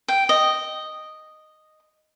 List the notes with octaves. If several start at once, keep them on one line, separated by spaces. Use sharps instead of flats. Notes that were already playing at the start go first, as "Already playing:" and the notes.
G5
D#5